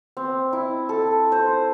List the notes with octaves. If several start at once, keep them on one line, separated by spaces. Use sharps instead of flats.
C4
E4
A4
C5